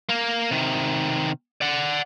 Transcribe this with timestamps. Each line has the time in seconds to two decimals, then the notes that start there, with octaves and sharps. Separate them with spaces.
0.09 A#3 A#4
0.51 C3 D#3
1.61 D5 F#5